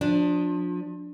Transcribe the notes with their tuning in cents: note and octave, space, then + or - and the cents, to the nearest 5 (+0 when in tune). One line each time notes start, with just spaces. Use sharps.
F3 +30 D4 +0